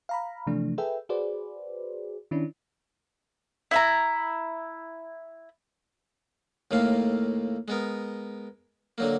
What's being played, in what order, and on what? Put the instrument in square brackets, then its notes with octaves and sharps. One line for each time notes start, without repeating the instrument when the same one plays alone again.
[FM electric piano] F5 A#5 B5
C3 E3 F3 A3 D4
G#4 A4 B4 E5 G5
F#4 G#4 B4 C5 D5
D#3 C#4 D4 E4
[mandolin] E4 E5 A#5
[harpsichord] D#2 A2 A3 A#3 F5
G#3 B3 A#4
D3 F#3 A#3